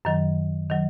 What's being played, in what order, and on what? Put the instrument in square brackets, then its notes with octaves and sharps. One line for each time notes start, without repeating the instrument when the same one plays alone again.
[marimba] F#2 D#3 F#3
D#3 F#3